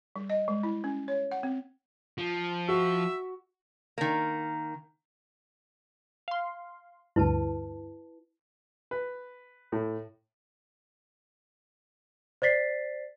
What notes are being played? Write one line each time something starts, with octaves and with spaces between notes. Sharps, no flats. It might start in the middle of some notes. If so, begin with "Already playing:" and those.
G3
D#5
G#3
E4
C#4
C#5
F#5
C4
F3
F#4 E5
D#3 A#3
F5 C6
D2 G2 E4 B4 A5
B4
A2
C5 D5 A6 B6 C7